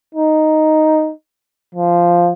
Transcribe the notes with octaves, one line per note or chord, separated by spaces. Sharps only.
D#4
F3